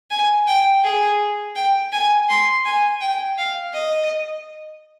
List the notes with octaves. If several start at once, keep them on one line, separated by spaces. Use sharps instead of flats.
G#5
G5
G#4
G5
G#5
C6
G#5
G5
F5
D#5